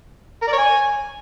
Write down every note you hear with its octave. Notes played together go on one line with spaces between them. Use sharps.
A#4
D5
C#5
G#5